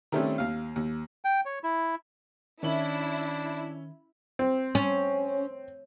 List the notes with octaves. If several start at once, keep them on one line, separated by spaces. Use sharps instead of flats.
D#3 G3 A3 C4 C#4
D#2 F5
D#2
G5
C#5
E4
D#3 C#4 D4 E4 E5 F#7
C4
C#4